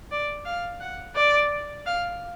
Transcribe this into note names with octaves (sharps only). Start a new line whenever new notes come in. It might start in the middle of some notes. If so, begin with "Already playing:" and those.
D5
F5
F#5
D5
F5